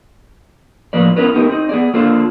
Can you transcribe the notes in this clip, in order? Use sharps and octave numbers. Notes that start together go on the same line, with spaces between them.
A2 F3 A#3 B4 D5
B3 C#4 E4 A#4 B4
A3 B3 D#4 G4 A#4
C4 D#4
B3 G#4 D5
A#3 D4 F4 A4 C5